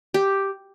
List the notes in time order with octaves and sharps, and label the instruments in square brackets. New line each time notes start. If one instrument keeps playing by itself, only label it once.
[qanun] G4